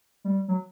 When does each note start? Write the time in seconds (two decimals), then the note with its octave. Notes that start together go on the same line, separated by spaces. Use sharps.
0.24 G3
0.48 F#3